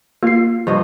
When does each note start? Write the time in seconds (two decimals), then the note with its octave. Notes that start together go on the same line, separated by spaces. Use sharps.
0.23 A#3 F4 C7
0.67 G2 F3 D#5